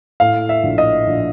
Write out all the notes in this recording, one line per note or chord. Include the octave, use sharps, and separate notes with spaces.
A2 F5
E5
A#1
D#5
A#1